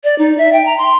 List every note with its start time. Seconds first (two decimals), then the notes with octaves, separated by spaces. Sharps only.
0.04 D5
0.18 D#4
0.38 E5
0.53 G5
0.65 A#5
0.78 C6